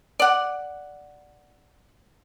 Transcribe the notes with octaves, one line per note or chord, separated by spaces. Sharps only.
D5 F#5